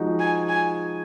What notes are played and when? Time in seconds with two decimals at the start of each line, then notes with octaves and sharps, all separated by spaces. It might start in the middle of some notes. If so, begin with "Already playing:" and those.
Already playing: F3 G#3 D#4 F#4
0.19 G#5
0.49 G#5